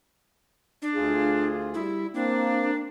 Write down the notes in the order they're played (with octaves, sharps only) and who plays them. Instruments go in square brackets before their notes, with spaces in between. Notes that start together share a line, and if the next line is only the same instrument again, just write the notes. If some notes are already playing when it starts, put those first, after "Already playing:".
[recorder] D4
[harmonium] D2 F4 G#4
[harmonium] G3 [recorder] E4
[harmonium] A#3 C4 [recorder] D4